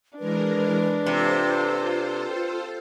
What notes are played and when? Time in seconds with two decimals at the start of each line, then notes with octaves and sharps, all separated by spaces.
0.18 E3 G#3 D4 A#4 B4
1.06 C3 F4 A4 C5